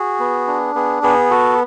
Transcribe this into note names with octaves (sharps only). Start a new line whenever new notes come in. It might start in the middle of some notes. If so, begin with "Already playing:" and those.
Already playing: F#4 G#4
B3
D4
B3 G#4
B3 G#4
F#4 A4